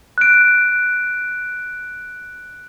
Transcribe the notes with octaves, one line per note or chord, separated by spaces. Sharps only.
F#6 D7